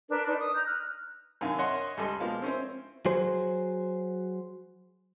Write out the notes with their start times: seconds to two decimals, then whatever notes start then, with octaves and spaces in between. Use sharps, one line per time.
0.09 D4 A#4 B4
0.26 D4 D#4 B4 D5
0.37 D#6
0.55 A#5 G6
0.67 F6 F#6
1.41 F#2 C3 D#3 D4 F5 G#5
1.59 C#5 D#5 E5 F#5 C6
1.97 C#2 G3 A4 D#5 C6
2.20 B2 F3 G#3 A#3 F5
2.42 C4 C#4 E4 C5
3.06 F#3 G#4 C5